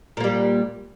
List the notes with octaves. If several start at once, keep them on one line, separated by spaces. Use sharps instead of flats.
A#2 G3 A#3